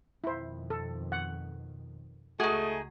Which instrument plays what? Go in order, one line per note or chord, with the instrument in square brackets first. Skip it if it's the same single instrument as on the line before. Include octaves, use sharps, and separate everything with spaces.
[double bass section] F2 B2 D#3 [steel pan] E4 C5
[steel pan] A4
F#5
[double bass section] C#2 [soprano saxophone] A3 [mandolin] D#4 G#4 [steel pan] F#4